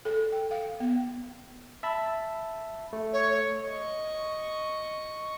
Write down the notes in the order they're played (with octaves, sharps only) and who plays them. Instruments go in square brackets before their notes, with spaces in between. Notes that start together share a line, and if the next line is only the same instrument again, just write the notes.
[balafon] A4
G5
F5
B3
[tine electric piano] E5 A5 B5
A3
[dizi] C#5
[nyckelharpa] D#5 C#6